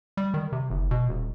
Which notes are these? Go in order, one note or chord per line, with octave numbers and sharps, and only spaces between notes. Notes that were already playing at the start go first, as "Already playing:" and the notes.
G3
D#3
C3
F#1
B2
D#1